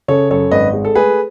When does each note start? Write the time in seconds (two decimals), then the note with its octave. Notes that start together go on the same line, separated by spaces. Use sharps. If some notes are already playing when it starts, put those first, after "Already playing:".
0.08 C#3 A4 C#5
0.30 F#2 A4 C#5
0.51 G#1 B4 D#5
0.73 G#3
0.85 A4
0.95 A3 G#4 B4